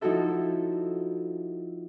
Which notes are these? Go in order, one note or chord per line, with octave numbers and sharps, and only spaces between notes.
F3 D#4 E4 F#4 A4 E5